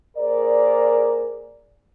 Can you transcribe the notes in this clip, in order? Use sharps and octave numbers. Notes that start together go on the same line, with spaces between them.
A#3 G#4 A#4 C5 D5